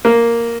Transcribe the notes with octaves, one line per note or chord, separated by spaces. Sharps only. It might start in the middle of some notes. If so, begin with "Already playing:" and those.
A#3